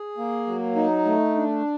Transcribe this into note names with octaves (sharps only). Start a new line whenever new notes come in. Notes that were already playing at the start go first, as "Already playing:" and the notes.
Already playing: G#4
A#3
F#3
D#4
A3
D4